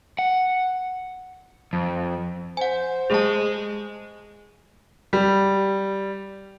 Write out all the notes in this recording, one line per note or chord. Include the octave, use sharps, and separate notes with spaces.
F#5
F2
C5 F#5 G#5
G#3 G#4 A5
G3